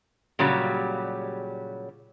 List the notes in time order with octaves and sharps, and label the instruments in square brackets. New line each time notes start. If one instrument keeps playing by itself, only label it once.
[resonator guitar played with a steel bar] A#2 C#3 F#3 G3 G4